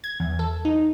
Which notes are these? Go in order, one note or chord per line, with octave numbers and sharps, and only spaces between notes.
G#6
E2
A4
D#4